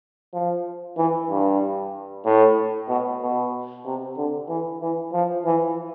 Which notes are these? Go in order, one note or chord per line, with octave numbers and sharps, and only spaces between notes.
F3
E3
G2
A2
B2
B2
C3
D3
E3
E3
F3
E3